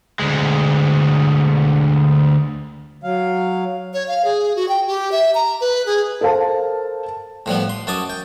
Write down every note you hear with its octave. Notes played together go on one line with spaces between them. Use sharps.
D2 G#3
F#3 F5
C#5
F5
G#4
F#4
G5
G4
E5
A#5
B4
G#4
A4 A#4 C5 F5 A5
A2 F3 G3 B3
C6
F#2 C#4 A5 D6 D#6
G5